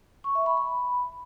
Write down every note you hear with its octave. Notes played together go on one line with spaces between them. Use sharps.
C#6
E5
B5
B5